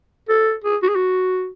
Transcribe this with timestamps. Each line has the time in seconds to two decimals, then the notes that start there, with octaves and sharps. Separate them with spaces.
0.29 A4
0.64 G#4
0.83 F#4
0.89 G#4
0.96 F#4